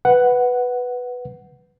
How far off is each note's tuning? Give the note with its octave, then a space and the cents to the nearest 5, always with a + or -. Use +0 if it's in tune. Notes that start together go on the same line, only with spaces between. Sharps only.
B4 +0 F#5 +0